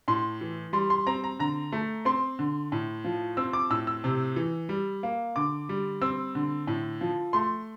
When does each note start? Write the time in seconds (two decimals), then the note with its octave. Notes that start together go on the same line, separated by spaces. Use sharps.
0.08 A2 C6
0.41 E3
0.73 G3 C6
0.90 C6
1.07 C4 A#5
1.24 A#5
1.39 D3 A#5
1.72 A3
2.05 C4 C6
2.39 D3
2.72 A2
3.04 F3
3.37 C4 E6
3.53 D6
3.70 A2 E6
3.87 E6
4.04 C3
4.36 E3
4.69 G3
5.03 A#3
5.36 D3 D6
5.69 G3
6.01 C4 E6
6.35 D3
6.67 A2
7.01 F3
7.33 A3 C6